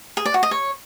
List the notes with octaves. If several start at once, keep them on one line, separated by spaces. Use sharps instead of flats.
G#4
D5
F#4
D#5
C#5